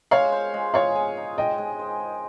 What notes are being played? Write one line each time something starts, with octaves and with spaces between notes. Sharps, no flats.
G#3 C#5 F5
C5
G#3
G#4 C#5 F5
G#4
D#4
G#3 D#5 G5
G#3
C5
C5